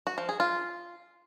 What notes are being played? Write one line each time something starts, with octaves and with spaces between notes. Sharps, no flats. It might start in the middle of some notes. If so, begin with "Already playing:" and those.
F#4
F3
G#4
F4